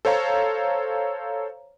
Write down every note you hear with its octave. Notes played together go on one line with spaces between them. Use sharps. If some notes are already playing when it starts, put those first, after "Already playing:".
A4 C5 C#5 F5 A#5